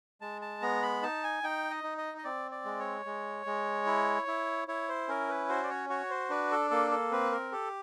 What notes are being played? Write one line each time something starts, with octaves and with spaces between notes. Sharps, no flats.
G#3 A5
A5
B3 A#5
B5
D#4 A5
G#5
D#4 G5
D#5
D#4
D#5
D#5
C4 D5
D5
G#3
C#5
G#3
G#3
E4
E4
E4 C#5
C5
C#4 A#4
B4
F#4 C5
D5
C#5
F#4 C#5
C5
D4 B4
A4
A#3 A4
A4
C4 B4
A#4
G4 A4